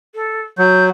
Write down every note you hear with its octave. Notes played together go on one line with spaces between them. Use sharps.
A4
F#3 G6